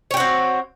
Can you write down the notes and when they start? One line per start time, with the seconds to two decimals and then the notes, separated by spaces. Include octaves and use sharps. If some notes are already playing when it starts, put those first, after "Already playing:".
0.11 C#5
0.14 G4
0.17 F#4
0.20 C4